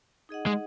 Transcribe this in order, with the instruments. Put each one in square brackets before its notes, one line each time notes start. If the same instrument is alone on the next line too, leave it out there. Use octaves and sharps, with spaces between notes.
[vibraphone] D#4 G#4 D#5 F#5
[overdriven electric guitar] G#3